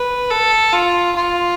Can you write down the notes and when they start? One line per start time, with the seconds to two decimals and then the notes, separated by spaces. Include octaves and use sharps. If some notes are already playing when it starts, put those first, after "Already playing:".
Already playing: B4
0.30 A4
0.73 F4
1.17 F4